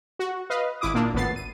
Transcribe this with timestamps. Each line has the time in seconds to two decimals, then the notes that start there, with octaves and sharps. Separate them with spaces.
0.19 F#4
0.50 B4 D#5 F5
0.81 G#1 E4 D6 D#6
0.94 A#2 A#3 D4
1.14 G#1 C#2 A2 B3 A6 C7
1.36 D#7